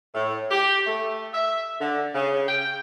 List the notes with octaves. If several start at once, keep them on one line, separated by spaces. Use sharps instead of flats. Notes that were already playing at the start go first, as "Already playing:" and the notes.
A2
G4
A3
E5
D3
C#3
G5